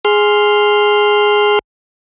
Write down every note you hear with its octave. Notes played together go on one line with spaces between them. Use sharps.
G#4 C6 F6